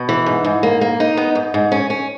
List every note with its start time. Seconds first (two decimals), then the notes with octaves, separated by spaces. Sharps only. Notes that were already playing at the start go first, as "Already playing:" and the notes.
Already playing: B2
0.09 E3
0.26 G#2
0.44 G#2
0.63 A#3
0.81 A#3
1.00 D#4
1.17 B3
1.35 G#2
1.54 G#2
1.72 C#4
1.90 C#4